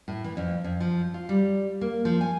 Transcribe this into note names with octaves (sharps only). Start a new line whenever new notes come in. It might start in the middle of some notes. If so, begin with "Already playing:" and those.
A2
E3
F2
F2
F3
F4
G3
A#3
F3
G#5